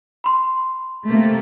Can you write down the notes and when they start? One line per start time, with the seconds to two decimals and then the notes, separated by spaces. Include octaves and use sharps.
0.24 B5 C6
1.07 C3 A3 A#3